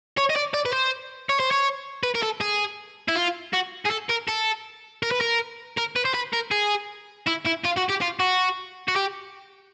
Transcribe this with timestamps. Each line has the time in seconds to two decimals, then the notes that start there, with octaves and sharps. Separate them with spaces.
0.17 C#5
0.30 D#5
0.36 D5
0.54 D5
0.66 B4
0.73 C5
1.29 C#5
1.40 C5
1.51 C#5
2.03 B4
2.15 A#4
2.23 A4
2.41 G#4
3.08 E4
3.16 F4
3.53 F#4
3.85 G#4
3.90 A4
4.09 A#4
4.28 A4
5.03 A#4
5.11 B4
5.21 A#4
5.77 A#4
5.96 B4
6.05 C5
6.14 B4
6.33 A#4
6.51 G#4
7.27 E4
7.45 E4
7.64 F4
7.77 F#4
7.89 G4
8.01 F4
8.20 F#4
8.88 F#4
8.96 G4